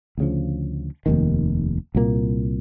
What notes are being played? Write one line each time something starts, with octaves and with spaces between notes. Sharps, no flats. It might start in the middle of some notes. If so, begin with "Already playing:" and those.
D2 C#3 F3
F1 D#2 D#3
C2 A#2 F3 A#3